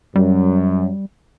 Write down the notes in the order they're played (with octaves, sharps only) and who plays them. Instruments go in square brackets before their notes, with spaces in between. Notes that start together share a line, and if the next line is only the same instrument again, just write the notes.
[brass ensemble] F#2 [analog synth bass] G3